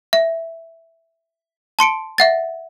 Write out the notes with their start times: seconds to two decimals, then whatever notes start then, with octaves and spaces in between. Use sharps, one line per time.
0.13 E5
1.79 A5 C6 C#7 D7
2.18 E5 F#5 A6